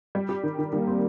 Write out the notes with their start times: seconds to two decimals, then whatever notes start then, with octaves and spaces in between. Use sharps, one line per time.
0.15 G3
0.29 G4
0.43 D#3
0.59 D#3
0.73 D#3 G3 A#3
0.87 C4